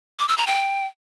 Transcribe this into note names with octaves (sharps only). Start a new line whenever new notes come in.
D6
E6
A#5
G5